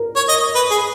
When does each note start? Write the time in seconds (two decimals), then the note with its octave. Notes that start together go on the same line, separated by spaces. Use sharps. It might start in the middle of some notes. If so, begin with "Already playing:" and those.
Already playing: A#4
0.16 C#5
0.29 D#5
0.55 B4
0.71 G#4